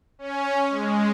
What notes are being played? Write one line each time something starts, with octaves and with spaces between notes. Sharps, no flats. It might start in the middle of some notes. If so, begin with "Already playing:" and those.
C#4
G#3